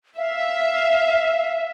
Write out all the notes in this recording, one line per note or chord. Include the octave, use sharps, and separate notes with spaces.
E5 F5